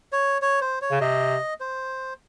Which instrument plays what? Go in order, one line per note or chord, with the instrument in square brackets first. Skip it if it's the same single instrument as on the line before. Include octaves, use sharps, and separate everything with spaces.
[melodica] C#5
C#5
C5
C#5
[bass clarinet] C#3
[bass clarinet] C3 [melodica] D#5
[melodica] C5